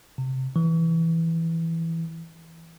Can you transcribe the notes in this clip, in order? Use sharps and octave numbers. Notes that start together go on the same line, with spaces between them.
C3
E3